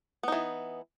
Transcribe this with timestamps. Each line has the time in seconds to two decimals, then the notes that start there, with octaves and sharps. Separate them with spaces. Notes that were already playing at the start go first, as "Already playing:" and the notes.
0.23 B3
0.28 D#4
0.32 E3